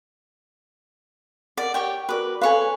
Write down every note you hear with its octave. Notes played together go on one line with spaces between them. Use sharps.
A#4 D5 F#5
G4 C#5 G5
F#4 A#4 B4 D5 D6
A4 B4 C#5 F5 G#5